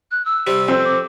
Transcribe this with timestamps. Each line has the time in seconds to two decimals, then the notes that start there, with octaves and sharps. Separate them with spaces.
0.11 F#6
0.25 E6
0.47 C3 G3
0.68 F2 C4 C5
0.85 D6